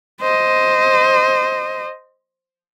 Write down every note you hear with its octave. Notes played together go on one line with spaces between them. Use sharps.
C5 D#5